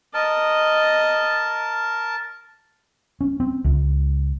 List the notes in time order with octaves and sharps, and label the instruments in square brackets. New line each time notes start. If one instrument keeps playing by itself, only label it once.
[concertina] A#4 A5 [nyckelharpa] D#5
[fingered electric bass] C#4
C4
C#2